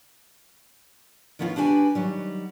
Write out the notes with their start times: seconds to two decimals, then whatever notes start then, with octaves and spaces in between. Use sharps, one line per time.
1.39 D#3 F3 B3 C#4 D#4 F4
1.56 D4 F#4 G4 B4 G#5
1.95 D#3 F#3 G3